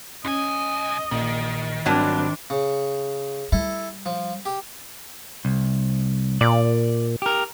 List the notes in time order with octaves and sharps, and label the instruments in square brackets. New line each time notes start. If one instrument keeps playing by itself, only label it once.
[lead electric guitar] B1 G#5 [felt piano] C#4 [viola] D#5
[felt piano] A#1 [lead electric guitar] D#3
[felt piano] G#1 [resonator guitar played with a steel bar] F#3 G3 A5 [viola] C4 D4
[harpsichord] C#3
[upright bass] G3 [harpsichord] E4 A4
[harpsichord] F3
G4
[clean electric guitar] C2
[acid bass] A#2 [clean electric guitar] D5
[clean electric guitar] G4 A#4